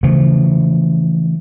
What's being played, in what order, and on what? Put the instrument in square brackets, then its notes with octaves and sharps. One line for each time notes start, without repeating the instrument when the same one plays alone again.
[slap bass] C#3 E3 F3 A3